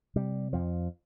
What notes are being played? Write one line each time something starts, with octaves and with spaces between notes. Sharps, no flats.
C3 G3
F2 F3